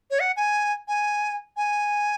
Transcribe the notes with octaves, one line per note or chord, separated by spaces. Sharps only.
C#5
F#5
G#5
G#5
G#5